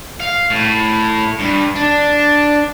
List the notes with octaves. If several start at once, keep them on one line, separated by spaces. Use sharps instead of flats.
F5
A2
G2
D4